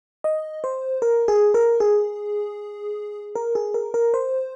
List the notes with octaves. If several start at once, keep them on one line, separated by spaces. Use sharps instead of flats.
D#5
C5
A#4
G#4
A#4
G#4
A#4
G#4
A#4
A#4
C5